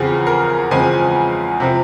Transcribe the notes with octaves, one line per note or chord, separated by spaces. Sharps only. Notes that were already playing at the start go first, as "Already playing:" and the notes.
Already playing: E2 C#3 F3 C4 G#4
A#4
E2 C#3 F3 G#3 C4 G#5
C3 F3 C4